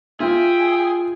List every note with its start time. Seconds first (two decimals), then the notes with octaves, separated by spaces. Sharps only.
0.20 F4 G#4 E5 G5